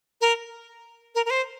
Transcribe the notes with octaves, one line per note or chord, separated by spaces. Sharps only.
A#4
A#4
A#4
C5